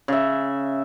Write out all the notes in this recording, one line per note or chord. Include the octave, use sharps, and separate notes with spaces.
C#3 E5